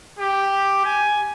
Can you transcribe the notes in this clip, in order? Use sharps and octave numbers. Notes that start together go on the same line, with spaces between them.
G4
G#5